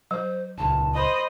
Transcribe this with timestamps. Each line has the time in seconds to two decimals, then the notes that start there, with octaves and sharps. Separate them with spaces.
0.11 F#3 C5
0.58 D#1 C#2 A5
0.94 C5 D#5 B5